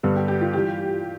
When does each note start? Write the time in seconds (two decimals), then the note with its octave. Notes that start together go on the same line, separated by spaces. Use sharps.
0.03 G2 D3 G3 B3
0.16 G4
0.28 G4
0.41 F4
0.53 E3 G3 G4